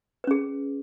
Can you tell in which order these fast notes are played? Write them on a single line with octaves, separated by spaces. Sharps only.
B4 C#4 G#4